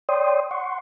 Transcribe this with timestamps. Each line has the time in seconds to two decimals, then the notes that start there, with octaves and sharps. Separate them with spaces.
0.09 C#5 D5 G5 C6 D#6
0.51 F#5 C6 C#6